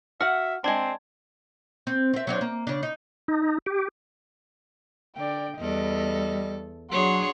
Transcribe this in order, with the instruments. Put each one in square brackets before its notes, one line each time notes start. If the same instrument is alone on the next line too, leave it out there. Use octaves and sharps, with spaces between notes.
[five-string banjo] F#4 F#5 [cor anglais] E5 [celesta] F6
[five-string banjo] G#3 D4 [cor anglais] C4 [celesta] A5 G#6
[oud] C4
C4 E5
F#3 C4 D4
A#3
C#3 D4
D#4
[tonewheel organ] D#4
G4
[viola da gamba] D3 [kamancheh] D5 G5
[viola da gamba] E2 A4 [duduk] G3 [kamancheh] D#5
[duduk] F#3 [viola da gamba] D4 G#4 C#5 [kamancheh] F#4 C6